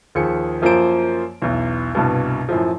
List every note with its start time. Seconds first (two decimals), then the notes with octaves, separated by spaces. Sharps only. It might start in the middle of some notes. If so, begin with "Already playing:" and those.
0.15 D#2 F3 G#4 C#7
0.62 F#2 F3 A#3 F4 C5 D7
1.42 B1 E2
1.95 C2 G2 B2
2.49 F#2 A2 F3